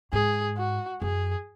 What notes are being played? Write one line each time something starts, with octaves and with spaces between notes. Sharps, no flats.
G#2 G#4
F#4
F#2 G#4